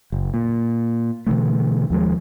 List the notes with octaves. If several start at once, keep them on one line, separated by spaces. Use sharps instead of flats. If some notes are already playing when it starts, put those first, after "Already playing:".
F#1
A#2
B2 D3 E3 A3
D#2 F3 G#3